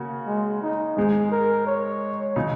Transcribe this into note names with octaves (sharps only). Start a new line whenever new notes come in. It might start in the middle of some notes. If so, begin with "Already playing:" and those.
Already playing: C#3 A#3 F#4
G#3
D#4
G#2 G#3 D#4 G#4
A#4
C#5
C#3 F#3 D#4